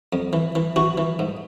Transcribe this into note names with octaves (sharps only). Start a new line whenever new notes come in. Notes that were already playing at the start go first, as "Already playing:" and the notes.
F2
E3
E3
E3 F#4
E3
G#2